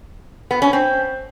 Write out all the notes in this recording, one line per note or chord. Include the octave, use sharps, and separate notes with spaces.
B3
C#4
C4